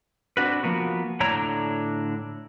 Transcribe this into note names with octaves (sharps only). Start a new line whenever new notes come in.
C4 D4 F#4 B4
F3 A#3 B3 F#4
A2 D3 D4 C#5 A#5